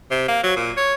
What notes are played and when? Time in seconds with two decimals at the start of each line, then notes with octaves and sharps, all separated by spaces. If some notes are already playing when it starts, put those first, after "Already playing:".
0.11 C3
0.28 A#3
0.44 F#3
0.56 A#2
0.77 C#5